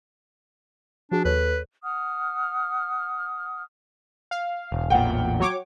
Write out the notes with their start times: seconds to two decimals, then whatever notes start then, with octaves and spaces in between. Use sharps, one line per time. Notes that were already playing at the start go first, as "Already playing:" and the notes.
1.11 F3 D4 F#4 G#4
1.25 D#2 A4 B4 C#5
1.83 F#5 D#6 F6
4.31 F5
4.72 E1
4.90 A1 E2 A#2 F#5 G5
5.40 F#3 C#5 D6